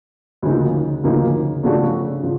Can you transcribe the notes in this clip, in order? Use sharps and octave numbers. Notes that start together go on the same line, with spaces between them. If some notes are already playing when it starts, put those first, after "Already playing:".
D2 C#3 F3 A#3 D#4
D2 C#3 F3 A#3 D#4
C#3 F3 A3 D4 F#4
C#3 F3